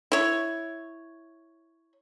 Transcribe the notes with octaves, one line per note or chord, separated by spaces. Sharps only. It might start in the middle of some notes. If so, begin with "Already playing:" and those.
E4 C#5